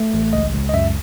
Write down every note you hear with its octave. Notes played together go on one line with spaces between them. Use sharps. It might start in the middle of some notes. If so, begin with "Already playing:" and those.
Already playing: A3
A1
C#2 D#5
C#2
D#5
F#2 E5